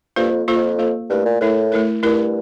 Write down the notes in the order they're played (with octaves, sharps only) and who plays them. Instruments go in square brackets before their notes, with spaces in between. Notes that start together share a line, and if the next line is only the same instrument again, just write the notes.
[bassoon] G2 [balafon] A#3 F4 A4 C5
[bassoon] F2
[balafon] A#3 F4 A4 C5
[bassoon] F2
[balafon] A#3 F4 A4 C5
[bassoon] G2 [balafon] A3 E4 A#4
[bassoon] A#2
[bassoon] A2 [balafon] A3 E4 A#4
[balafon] A3 E4 A#4
[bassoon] G2 [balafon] A3 E4 A#4